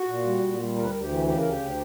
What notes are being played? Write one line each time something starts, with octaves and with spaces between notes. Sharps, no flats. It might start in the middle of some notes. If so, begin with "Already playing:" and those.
Already playing: F#4
A#2
G3
A#2
G3
D2 A#4
B4
D2 A#4
G4
E3
C#3 G4
D2 A#4
G4
D2